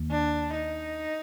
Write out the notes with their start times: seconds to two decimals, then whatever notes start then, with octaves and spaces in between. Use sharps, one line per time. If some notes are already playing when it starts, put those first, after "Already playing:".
Already playing: D#2 D#3 A#3
0.11 D4
0.54 D#4